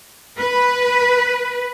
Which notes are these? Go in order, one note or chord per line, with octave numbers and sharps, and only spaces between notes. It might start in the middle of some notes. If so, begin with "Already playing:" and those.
B4